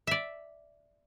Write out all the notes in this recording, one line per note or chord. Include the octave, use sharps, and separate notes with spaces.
D5 E5